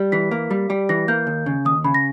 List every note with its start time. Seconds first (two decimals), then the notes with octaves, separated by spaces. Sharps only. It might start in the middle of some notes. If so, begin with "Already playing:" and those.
Already playing: G3
0.12 E3 B6
0.31 A#3
0.51 G3
0.70 G3
0.89 E3 A#6
1.08 A#3 G6
1.27 D#2
1.46 C#3
1.65 D#2 D#6
1.84 C#3 B5
1.94 A#6